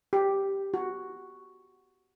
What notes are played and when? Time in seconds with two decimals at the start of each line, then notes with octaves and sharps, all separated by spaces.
0.13 G4
0.74 F#4